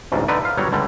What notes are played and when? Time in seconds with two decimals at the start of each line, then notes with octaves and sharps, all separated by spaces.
0.12 A1 D2 G#2
0.28 D3 D#4 B4 D5
0.45 F5
0.57 G1 F#3 G3 C#5 A#5
0.71 C#2 D3 G3